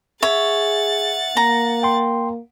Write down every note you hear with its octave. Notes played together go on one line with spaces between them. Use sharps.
G#4 C#5 E5 F#5 A6
A#3 A#5
G5 C6